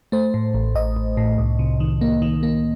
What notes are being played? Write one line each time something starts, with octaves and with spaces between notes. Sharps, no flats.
A3 C5
A2
A1
A1 D#5
A1
A2
C2
C3
D#3
A#3
D#3
A#3